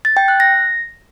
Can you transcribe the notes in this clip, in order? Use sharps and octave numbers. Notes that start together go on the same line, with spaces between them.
A6
G5
F#6
A#6